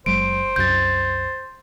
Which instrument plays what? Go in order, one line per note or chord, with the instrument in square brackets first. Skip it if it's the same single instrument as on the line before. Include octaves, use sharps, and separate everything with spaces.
[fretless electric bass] F#1 F#3 G#3 [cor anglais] C5 [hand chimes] D7
[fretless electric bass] C2 F#2 [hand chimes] G6 A6